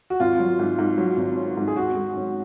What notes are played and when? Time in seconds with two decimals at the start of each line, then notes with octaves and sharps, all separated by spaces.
0.10 F#4
0.20 G#1 F4
0.39 F#3
0.59 G#2
0.79 G#2
0.98 F#3
1.17 G#1
1.37 C#4
1.57 G#2
1.68 G#4
1.76 G#1 F#4
1.96 G#3
2.16 F#2